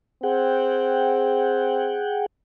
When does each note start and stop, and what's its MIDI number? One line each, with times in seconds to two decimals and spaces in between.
0.23 2.05 60
0.23 2.26 68
0.23 2.26 78
0.23 2.26 79